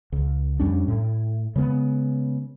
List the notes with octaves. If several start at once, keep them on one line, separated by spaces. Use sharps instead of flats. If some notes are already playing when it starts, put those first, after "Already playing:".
C#2
F2 G3 C#4 D4
A2
C#3 G#3 A#3 B3